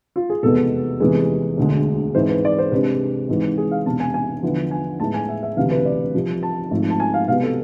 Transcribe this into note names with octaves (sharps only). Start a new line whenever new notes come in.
F4
G#4
F1 E2 B2 G#3 B3 A4
F1 E2 C3 E3 G#3 G#4
E1 D2 D3 G#3
G#2 E3 G#3 C4 E4 C5
B4
D5
C5
C2 C3 G#3 D4 B4
G#1 G#2 E3
G#4
F5
E1 E2 C3 A5
G#5
G#5
E2 D3 F3 B3 E4
G#5
A2 G#3 B3 E4 A5
G#5
E5
E5
E1 D2 C3 E3 F5
B4
D5
C2 C3 F3
A5
G#1 G#2 F3 A3
A5
G#5
F5
C2 B2 B3 F5
A4